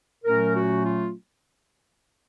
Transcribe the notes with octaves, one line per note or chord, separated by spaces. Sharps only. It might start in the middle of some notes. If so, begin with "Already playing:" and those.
A#2 F#3 A3 C#4 A#4
F#4
F4